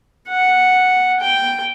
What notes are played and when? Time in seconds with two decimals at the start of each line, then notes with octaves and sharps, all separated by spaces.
0.28 F#5
1.20 G5